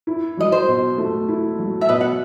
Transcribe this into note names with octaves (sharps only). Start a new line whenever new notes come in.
E4
F#3 D#5
C5
B2
A3
E4
F#3
E5
B2 B4 D#5
F#5